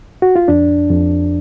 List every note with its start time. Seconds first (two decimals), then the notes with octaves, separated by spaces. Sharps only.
0.22 F#4
0.36 F4
0.48 F2 D4
0.90 F2